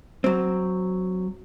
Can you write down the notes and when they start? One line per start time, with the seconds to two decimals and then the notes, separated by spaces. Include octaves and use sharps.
0.24 F#3 C4